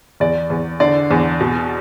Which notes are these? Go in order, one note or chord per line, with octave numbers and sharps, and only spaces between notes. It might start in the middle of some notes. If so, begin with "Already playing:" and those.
E2 D5
E2
D3 D5
E2
B2